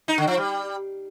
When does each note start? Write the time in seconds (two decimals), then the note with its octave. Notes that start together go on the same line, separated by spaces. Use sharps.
0.08 D#4
0.18 D3
0.27 F3
0.37 G3